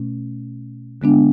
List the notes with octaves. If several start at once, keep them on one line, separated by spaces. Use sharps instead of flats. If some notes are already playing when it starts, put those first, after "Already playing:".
Already playing: B2 A3 C#4
D3 G#3 B3 D4